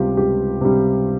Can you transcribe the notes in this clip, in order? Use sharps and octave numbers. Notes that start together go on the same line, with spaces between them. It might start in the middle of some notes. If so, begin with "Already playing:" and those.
Already playing: C#2 C3 G3 F4 G4
C#2 G4
C3 G3